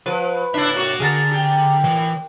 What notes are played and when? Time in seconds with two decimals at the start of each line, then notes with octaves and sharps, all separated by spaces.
0.06 F3 B4
0.54 D4 E4 C#5 E5
0.76 A#3 F#4
1.00 D3 G#4 A#4 A5
1.31 G4
1.84 A2 E3